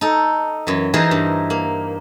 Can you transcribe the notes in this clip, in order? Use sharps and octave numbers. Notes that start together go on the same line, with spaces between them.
D#4 A4
F#2 E3
E3 D#4 E4 G#4 A#4 C5
G2
A#3